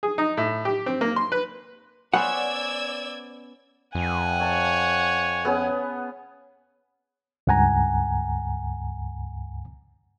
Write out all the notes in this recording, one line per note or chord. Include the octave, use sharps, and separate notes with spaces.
G#4
D#4
A2
G4
C4
A#3
C6
B4
B3 C#4 C5 D5 F#5 E6 G#6
F2 F#5 G#5
C#5 A5
B3 C#4 G#4
C#2 G2 F#5 G#5 A#5